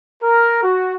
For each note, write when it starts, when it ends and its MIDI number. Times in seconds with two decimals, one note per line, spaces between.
0.23 0.62 70
0.62 0.94 66